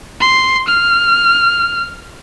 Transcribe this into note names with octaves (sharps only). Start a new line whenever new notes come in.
C6
F6